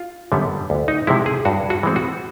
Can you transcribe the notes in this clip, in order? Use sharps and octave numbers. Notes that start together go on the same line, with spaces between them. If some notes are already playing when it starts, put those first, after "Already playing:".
Already playing: F4
F#2 D3 G3 B3
D2
D#4
C3 F3 G#3 E4
G#4
G2 F#4
F#4
E3 G#3 C4
F#4